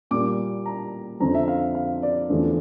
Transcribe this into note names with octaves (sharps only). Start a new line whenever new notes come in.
A#2 G3 A#3 D6
A#5
F2 D3 F3 C4 A#5
E5
F5
F5
D5
E2 D3 F3 A3